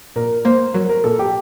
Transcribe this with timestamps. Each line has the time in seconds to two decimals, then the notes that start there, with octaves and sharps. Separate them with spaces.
0.16 A#2 A#4
0.45 A#3 C5
0.74 F#3 A#4
0.89 A#4
1.04 A#2 A4
1.19 G4